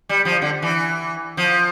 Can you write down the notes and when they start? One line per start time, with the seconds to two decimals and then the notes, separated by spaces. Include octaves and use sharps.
0.09 G3
0.25 F3
0.42 D3
0.62 E3
1.37 F3